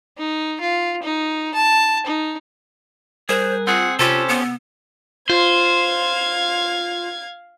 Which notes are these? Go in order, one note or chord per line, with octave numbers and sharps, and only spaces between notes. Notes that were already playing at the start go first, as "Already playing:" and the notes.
D#4
F4
D#4
A5
D#4
G3 G#4 A#4 C5 F#6
C4 F4 G#4 F#5
C3 C#4 F4 G4 A4 C5 E6 D#7
B3
F4 C5 F5 G#6